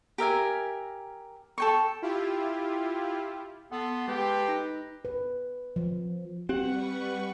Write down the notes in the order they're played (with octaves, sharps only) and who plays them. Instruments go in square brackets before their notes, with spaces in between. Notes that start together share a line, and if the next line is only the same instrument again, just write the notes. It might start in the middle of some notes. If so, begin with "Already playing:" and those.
[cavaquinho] G4 A#4 E5 G#5
A4 G5 C#6
[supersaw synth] E4 F4 G4
[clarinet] B3 [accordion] A4 C6 [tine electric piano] F#5
[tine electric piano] G#3 [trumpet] G4 [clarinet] B4
[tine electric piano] D#4 A#6
[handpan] B4
F3
[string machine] G3 B4 C#6 [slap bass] C4 [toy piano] G4 [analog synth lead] F#5